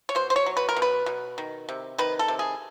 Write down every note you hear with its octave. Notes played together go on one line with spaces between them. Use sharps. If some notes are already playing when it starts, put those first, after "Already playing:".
C#5
B2 C5
C5
C#5
F#3
B4
A#4
B2
B4
B2
D#3
C3
D#3 B4
A4
C3
G#4